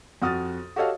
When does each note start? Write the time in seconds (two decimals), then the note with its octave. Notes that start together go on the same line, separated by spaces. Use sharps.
0.22 F2 F#4 D#6 F6 A6
0.76 F#4 G4 A4 C#5 D#5 F5